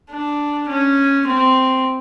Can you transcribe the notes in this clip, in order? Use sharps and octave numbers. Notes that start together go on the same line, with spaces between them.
D4
C#4
C4